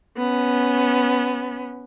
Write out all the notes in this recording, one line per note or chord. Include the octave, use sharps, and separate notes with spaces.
B3 C#4